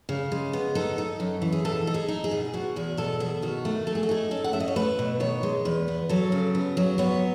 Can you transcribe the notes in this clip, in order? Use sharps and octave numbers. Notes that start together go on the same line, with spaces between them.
C#3
G#3
B3
D#4 A4
D#4
F#2
E3
G#4
B2 A4
D#4
G#4
D#4
G#4
B2
B2 F#4
E2 G#4
B2 A4
B2 G#4
D#3 F#4
A3
A3 A4
G#4
F#4
D#4 G#4
C#4 A4
F#5
A3 E5
D#5
C#5
A3 B4
B2
D#3 C#5
G#3
E2 B4
B3
F#3 A4
C#3
B3
F#3
B3 C#5